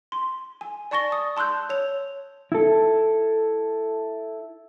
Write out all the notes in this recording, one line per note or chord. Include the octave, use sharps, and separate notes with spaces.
C6
G#5
D5 A5 C#6 A6 A#6 G7
D#6
A5 C6 E6 F#6 G6
C#5 F7
E4 A4